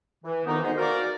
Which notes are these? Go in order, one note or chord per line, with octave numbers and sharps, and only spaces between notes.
E3
F2 C3 D#3 E3 B3 D#4
D2 G#3 B3 D#4 C5
A#3 F#4 A#4 D5